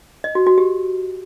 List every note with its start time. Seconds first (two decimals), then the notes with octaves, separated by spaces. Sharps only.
0.24 D#5
0.35 F#4
0.46 F#4
0.58 G4